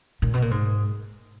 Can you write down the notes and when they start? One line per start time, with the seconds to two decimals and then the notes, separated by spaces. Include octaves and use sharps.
0.22 A#2
0.34 B2
0.42 A#2
0.51 G#2